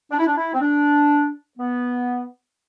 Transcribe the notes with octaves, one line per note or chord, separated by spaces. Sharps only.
D4
E4
D4
E4
C4
D4
B3